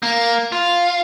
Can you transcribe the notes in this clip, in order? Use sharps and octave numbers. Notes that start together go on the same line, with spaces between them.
A#3
F4